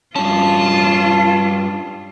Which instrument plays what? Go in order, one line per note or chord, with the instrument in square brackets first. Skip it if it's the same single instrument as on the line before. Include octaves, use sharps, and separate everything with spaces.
[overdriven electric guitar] G2 C#4 [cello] F4 [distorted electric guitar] A5